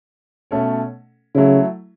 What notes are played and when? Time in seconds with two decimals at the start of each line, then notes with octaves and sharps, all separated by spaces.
0.51 B2 A3 C#4 A4 C#5
1.35 C#3 F#3 A3 E4